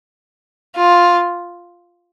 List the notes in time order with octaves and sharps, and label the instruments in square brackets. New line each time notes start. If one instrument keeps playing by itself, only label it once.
[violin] F4